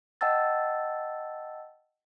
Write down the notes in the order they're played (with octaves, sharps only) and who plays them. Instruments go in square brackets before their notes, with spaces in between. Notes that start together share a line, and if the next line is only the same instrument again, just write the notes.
[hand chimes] D#5 F#5 G5 A5 E6 A6